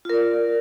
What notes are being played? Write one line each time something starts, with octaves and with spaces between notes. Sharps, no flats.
F4 A#4 D5